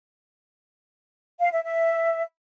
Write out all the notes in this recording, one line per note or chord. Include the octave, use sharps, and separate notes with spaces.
F5
E5
E5